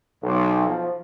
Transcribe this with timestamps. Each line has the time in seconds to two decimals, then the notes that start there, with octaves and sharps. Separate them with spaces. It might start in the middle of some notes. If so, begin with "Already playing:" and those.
0.23 B1
0.67 F3